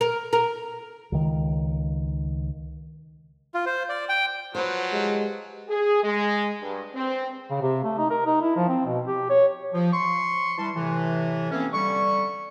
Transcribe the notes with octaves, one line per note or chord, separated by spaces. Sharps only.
A#4
A#4
C#2 D#3
F4
C5
D5
G5
F3 F#3 B4 C5
G#3 G4
G#4
G#3
G2
C4
C#3
C3
A3
D#4
A#4
D#4
E4
F3
C4
B2
G4
C#5
F3
C6 C#6
E3 G3 A5 C6
A2 C3 E3
E3 A3 A#3 C4 C#4
D3 G3 C#6